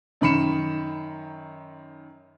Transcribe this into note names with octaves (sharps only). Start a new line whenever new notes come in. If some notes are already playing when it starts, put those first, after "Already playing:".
F#2 D#3 B5 C#7 E7